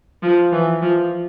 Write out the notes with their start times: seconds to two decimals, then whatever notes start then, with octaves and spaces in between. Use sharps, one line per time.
0.23 F3
0.53 E3
0.82 F3